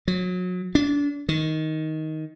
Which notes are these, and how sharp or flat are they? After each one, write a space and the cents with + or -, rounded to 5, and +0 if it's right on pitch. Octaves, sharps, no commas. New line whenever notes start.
F#3 -30
D4 -30
D#3 +10